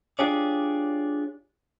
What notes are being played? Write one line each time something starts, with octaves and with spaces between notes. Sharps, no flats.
D4 F4 G4 G#4 C#5 D5